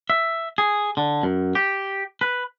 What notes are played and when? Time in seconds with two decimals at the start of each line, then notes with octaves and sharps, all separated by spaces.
0.10 E5
0.58 G#4
0.97 D3
1.23 F#2
1.55 G4
2.21 B4